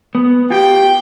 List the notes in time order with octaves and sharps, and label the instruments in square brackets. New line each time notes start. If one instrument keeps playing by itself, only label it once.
[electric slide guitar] B3
[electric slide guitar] F4 G4 [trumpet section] G5